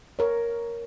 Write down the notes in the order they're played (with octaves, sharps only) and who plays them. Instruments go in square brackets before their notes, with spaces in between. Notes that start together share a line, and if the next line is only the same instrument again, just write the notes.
[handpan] A#4 C#5